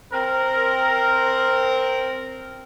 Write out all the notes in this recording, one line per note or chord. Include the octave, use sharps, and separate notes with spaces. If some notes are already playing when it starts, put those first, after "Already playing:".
C4 A#4